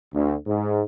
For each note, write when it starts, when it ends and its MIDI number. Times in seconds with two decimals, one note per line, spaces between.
0.13 0.34 38
0.46 0.81 44